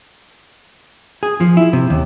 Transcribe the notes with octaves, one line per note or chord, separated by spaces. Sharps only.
G#4
F3
E4
C3
D#2